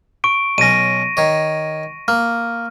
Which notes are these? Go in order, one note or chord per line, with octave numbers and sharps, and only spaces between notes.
C#6 D7
B1 C#4 A#6 D#7
D#3 C#5
A#3 F6